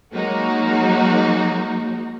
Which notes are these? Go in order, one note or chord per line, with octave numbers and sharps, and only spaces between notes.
F#3 G#3 A#3 D#4 F#4